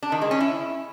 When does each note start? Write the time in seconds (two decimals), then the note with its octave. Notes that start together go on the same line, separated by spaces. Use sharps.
0.03 D4
0.12 D#3
0.21 G#3
0.31 C#4
0.40 E4